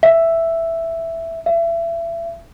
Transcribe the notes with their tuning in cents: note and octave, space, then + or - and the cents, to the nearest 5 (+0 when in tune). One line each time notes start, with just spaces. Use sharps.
E5 +5
E5 +30